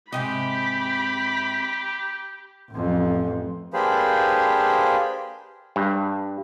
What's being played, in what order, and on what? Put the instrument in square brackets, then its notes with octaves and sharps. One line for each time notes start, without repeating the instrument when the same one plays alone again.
[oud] G#2 C3 D#5 [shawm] G4 [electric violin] B5
[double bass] A1 F2
[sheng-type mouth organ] A#3 D4 G4 G#4 B4 C5
[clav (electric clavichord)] G2